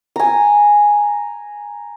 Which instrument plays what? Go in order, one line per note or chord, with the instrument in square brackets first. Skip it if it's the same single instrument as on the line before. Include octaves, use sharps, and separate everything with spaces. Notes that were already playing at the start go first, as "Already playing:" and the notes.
[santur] G#5 A#5